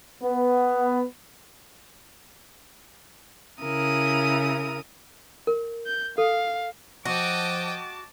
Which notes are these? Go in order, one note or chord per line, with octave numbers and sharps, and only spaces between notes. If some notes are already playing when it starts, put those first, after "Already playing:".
B3
C#3 E4 A#4 D#6
A#4
G6
A4 F5
F3 F#4 D#5 G5 A5 D6